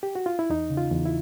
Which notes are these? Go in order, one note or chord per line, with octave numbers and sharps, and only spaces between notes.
G4
F#4
F4
E4
E2 D#4
C#3
F4
E2
E4